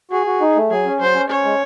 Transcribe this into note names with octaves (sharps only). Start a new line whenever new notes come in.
F#4 G#4
F#4
D#4
A3
F#3 G#4
C#4
F#3 C5
C#4
C#4 C#5
G#3